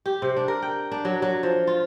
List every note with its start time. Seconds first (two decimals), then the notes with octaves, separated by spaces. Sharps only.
0.06 G4
0.22 C3
0.36 D4
0.48 A#4
0.62 G5
0.92 D4
1.05 F#3
1.22 F#3
1.43 F3
1.67 F4